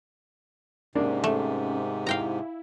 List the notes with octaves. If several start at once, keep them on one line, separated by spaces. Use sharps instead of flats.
G#2 C3 A#3 C#4 D4
A3 C#4
E4 F5 G5 A#5